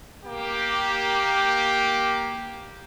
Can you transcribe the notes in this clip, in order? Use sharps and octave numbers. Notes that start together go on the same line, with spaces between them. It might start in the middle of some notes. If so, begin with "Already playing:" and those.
A#3 G4